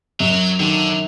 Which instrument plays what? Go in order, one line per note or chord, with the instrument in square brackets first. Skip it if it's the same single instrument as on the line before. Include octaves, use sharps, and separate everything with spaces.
[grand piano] F#2 [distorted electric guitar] F#3
[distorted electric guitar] D3 [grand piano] D#3